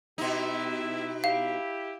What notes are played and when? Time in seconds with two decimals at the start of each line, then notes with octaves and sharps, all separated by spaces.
0.18 B2 D#4 E4 G4
1.24 E4 G4 F5